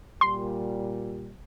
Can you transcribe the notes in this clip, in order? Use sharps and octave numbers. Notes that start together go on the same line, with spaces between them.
A#2 G3 C6